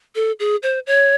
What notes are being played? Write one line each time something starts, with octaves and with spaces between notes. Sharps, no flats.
A4
G#4
C5
C#5